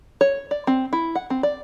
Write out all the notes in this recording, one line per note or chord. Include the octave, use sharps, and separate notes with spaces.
C#5
D5
C4
E4
F#5
C4
D5